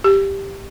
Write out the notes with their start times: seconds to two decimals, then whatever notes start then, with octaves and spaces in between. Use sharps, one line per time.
0.04 G4